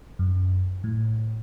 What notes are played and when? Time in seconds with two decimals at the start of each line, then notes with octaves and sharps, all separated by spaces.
0.19 F#2
0.84 A2